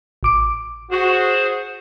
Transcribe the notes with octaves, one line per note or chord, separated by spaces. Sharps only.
A1 D6 D7
F#4 G#4 C5